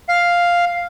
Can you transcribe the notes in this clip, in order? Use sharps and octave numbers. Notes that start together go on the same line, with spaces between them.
F5